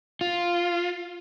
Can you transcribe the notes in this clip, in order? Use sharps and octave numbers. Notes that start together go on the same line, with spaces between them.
F4